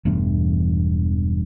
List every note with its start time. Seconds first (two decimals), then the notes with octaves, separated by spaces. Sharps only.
0.05 E1 E2 G2 A3